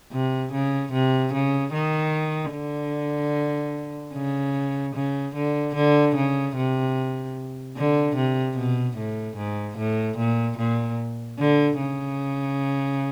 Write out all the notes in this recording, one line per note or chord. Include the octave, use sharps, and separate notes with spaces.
C3
C#3
C3
C#3
D#3
D3
C#3
C#3
D3
D3
C#3
C3
D3
C3
B2
A2
G#2
A2
A#2
A#2
D3
C#3